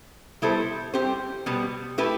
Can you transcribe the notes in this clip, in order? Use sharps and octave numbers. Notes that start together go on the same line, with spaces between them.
G3 B3 E4 A4 C5
G3 C4 G4 C5
B2 G3 B3
A3 E4 G4 B4